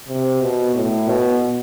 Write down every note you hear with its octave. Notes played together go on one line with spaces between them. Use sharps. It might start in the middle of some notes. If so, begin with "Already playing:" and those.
C3
B2
A2
B2